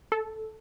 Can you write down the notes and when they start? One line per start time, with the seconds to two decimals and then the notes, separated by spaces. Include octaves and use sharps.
0.12 A4